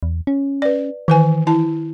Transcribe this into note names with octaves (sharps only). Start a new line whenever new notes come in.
E2
C#4
B4 D5
D#3 E3 B4 G#5
E4 A5